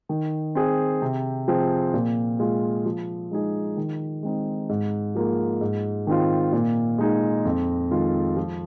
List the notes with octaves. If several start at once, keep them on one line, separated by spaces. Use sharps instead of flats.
D#3
C4 G#4
C3
F3 C4 G#4
A#2
G#3 F4 G#4
F3
G#3 D#4 G#4
D#3
G#3 C4 D#4
G#2
F3 A#3 F4 G#4
G#2
D#3 C4 F4
A#2
G#3 D#4 G#4
F2
D#3 G#3 F4
F3